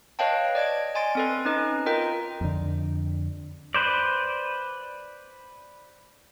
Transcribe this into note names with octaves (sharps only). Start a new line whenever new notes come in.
B4 C#5 D#5 F5 G5 A5
D5 D#5 G#6 D7
D#5 G#5 C6 A6 D7
C4 A4 B4
C#4 D#4 B4 D#5
F4 A#4 D#5 G5 A#5
F2 D3
B4 C5 D5